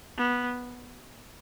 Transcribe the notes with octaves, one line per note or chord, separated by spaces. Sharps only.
B3